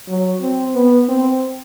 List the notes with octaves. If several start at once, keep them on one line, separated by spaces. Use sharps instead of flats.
F#3
C4
B3
C4